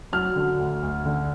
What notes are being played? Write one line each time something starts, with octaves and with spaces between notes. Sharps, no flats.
F#3 F6
D3
D2
D2
D3